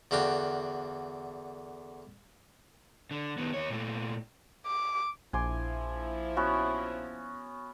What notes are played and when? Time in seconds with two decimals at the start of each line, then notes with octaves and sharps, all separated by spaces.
0.11 E2 D3 F#4 F5 G5
3.11 D3
3.38 D#3 B3
3.54 D#2 C#5
3.70 A#2 A3
4.66 D6
5.33 A#1 F3 E4 G#5 C6 D6
6.37 B3 C#4 F#4